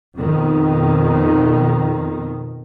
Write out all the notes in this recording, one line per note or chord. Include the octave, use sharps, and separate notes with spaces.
F2 B2 D#3